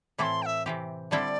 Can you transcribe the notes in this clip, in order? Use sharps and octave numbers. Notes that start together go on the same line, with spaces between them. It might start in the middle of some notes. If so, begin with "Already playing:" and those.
A2 E3 C4 E4 A4 C6 D6
G5
E5
C3 E3 C4 G4
D3 G3 C4 E4 A4 D5